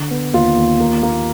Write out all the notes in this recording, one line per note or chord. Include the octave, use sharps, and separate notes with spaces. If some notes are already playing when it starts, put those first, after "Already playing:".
Already playing: D3
B3
D#2 F4
D#2
A#3
A#3